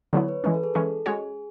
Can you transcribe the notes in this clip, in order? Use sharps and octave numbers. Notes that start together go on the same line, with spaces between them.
D3 F#3 B3 E4 C#5
B4
E3 G#3 C#4 B4
A4
G#4
E3 G#3 C#4 A4
G#3 C#4 F#4 G#4 C#5